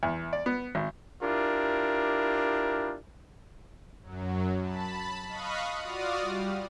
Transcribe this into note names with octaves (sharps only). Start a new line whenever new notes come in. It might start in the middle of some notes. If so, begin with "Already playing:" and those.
E2
D5
B3
G#1
D4 E4 F4 G4 A#4
F#2 F#3
A5 B5
D#5 F5 B5 C#6 D#6 F#6
F4 F#4 D5 D#6 F6
G3